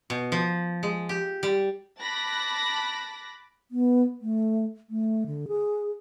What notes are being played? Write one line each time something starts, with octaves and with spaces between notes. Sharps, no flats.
B2
F3
G#3
G4
G3
A5 B5 D6 F#6 A#6
B3
A3
A3
D3
G#4